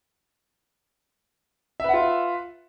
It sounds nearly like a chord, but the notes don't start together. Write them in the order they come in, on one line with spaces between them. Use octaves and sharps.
E5 B4 F#5 F4